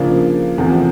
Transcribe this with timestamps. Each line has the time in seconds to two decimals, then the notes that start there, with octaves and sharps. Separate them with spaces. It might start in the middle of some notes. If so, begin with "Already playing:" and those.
Already playing: C#3 F3 A#3 D4
0.58 E2 C3 F3 A3